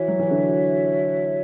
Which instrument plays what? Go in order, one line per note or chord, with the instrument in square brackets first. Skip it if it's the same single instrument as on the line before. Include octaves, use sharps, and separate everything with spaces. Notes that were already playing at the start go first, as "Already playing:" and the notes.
Already playing: [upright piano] E3 [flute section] F#4 C#5 E5
[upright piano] F#3
E3
D3